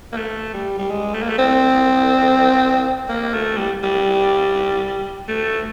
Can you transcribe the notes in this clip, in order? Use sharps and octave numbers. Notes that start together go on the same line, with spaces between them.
A#3
A3
G3
G3
G#3
A3
A#3
A3
C4
A#3
A3
G3
G3
A3